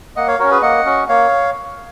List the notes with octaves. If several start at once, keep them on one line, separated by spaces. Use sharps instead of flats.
A#3 D#5 F#5
C#5 F5
C#4 F#4 A#4 C#5
G#4 B4
A#3 D#5 F#5
C#4 F#4
A#3 C#5 F5